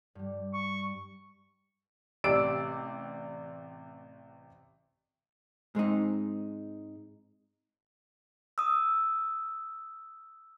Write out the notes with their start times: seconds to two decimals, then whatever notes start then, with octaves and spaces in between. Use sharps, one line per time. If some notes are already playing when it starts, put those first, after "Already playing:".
0.15 G2 G3
0.54 C#6
2.24 A1 C3 D5 E6 D7
5.75 G#2 G#3 C4 D#4
8.58 D#6 E6